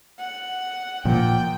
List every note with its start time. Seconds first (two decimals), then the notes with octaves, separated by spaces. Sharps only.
0.19 F#5
1.05 A#2 F3 G5